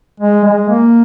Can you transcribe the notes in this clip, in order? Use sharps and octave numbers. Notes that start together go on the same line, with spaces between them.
G#3
G#3
A#3